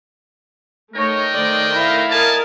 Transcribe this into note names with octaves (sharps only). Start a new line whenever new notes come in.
A3 D#4 A#4 C#5 D#5 G5
D#3 A3 C5 D5
E4 F5
A#4 D5 D#5 G#5 A5